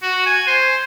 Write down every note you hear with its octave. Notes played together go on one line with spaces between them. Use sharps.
F#4
G#5
C5